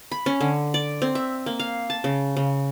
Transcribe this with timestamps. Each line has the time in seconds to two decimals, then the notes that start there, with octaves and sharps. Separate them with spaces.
0.11 B5
0.26 C#4
0.41 D3
0.74 D5
1.02 C4
1.15 E5
1.46 A#3
1.60 F5
1.90 A5
2.04 C#3
2.37 C#3